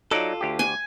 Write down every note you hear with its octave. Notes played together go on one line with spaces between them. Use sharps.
F#3 D#4 F4 A4 D5
D2 G4
G#5